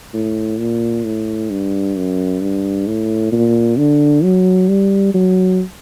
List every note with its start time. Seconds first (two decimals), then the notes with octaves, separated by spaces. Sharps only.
0.14 A2
0.59 A#2
1.05 A2
1.50 G2
1.96 F#2
2.42 G2
2.87 A2
3.32 A#2
3.78 D3
4.23 F#3
4.69 G3
5.14 F#3